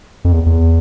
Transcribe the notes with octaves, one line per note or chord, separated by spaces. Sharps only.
F2
E2
E2